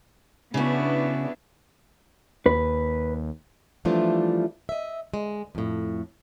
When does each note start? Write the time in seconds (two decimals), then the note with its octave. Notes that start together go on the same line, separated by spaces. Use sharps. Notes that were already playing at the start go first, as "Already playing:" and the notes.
0.54 C#3 B3 D4 E4 F#4
2.46 D#2 B4
3.85 E3 F3 G3 A3 D4 F4
4.69 D#5 E5
5.14 G#3
5.55 F2 A2